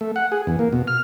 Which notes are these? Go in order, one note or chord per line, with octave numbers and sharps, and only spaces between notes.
A3
F#5
G#4
E2
A#3
B2
F6